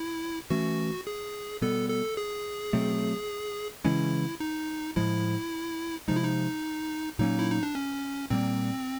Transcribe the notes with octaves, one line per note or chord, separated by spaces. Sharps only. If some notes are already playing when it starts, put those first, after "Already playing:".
Already playing: E4
E3 A3 C#4 F#4
G#4
B2 G3 B3 A4
A4
G#4
B2 F#3 A3 C4
C#3 E3 G#3 C#4 E4
D#4
A2 F3 G#3 E4
C3 F3 G#3 D#4
E4
D#4
A#2 F#3 A#3 C#4 D#4
E4
D#4
D4
C#4
A#2 G3 A#3 C4